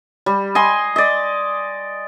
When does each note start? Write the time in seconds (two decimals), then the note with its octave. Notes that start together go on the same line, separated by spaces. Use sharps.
0.26 G3
0.55 D#5 G#5 C6
0.96 D5 D#5